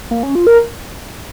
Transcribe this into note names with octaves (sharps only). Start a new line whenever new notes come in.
A#3
C#4
F4
A#4